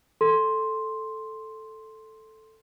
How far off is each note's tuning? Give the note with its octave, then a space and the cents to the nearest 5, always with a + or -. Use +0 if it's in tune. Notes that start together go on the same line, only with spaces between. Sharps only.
A4 +0 C6 +5